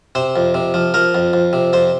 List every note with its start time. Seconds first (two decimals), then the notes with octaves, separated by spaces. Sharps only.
0.15 C3 C5
0.36 F2
0.54 C3
0.74 F3
0.94 F3 A#4
1.15 F2
1.33 F2
1.53 C3
1.73 F2 C5